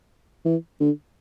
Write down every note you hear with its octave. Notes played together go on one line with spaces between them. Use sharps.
E3
D3